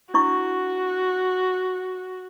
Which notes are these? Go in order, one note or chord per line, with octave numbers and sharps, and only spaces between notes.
D4 E4 F#4 C#6